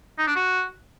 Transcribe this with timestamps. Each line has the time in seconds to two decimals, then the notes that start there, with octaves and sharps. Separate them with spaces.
0.19 D#4
0.27 D4
0.36 F#4